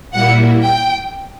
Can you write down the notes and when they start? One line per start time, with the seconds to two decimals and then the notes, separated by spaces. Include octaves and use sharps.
0.12 A#2 G3 A#3 E4 F#5
0.63 G5